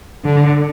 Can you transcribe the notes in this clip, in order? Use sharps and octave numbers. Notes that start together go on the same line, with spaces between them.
D3